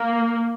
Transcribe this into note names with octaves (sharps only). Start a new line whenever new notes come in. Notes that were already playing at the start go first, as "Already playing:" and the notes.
Already playing: A#3